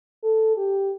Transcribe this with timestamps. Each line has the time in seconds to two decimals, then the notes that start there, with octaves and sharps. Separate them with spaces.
0.23 A4
0.57 G4